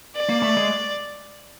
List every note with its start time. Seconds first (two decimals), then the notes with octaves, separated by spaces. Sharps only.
0.15 D5
0.29 A#3
0.43 A3
0.57 G#3